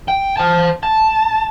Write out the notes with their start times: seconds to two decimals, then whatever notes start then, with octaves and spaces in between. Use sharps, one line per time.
0.08 G5
0.37 C5 A5
0.83 A5